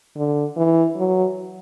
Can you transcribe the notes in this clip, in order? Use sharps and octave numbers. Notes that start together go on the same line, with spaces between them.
D3
E3
F#3